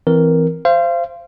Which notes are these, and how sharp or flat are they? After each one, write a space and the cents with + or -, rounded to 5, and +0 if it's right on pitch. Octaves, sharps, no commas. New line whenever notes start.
E3 +0 C4 -15 A#4 +0
C5 +0 F5 -35